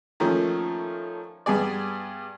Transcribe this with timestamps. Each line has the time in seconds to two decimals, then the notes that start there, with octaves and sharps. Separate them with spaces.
0.20 D#3 F3 A3 A#3 C#4
1.46 G2 B3 G#4 D5